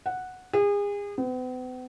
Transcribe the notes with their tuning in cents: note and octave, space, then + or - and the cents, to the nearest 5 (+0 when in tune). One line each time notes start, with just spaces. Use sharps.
F#5 -5
G#4 -35
B3 +45